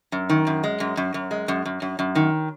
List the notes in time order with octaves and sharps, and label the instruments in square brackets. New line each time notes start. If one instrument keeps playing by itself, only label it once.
[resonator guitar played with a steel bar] F#2
D#3
F#2
G#3
F#2
F#2
F#2
G#3
F#2
F#2
F#2
F#2
D#3